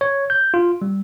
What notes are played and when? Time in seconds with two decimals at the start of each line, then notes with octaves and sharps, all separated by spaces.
0.01 C#5
0.30 G6
0.54 F4
0.82 G3